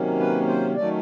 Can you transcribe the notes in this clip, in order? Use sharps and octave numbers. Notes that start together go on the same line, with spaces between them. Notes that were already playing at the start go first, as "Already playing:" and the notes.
Already playing: C3 D#3 F#3 A#3 C#4
B4
C5
D#3 F#3 A3 C#4 D5